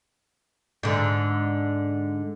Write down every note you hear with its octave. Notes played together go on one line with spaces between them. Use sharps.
G#2 D3